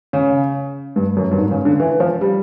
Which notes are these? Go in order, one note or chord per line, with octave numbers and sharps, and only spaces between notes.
C#3
G2
F#2
G2
G#2
C#3
D3
E3
F3
G3